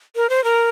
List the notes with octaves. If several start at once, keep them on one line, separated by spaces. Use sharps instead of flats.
A#4
C5
A#4